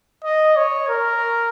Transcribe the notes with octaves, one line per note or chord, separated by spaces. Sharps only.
D#5
C#5
A#4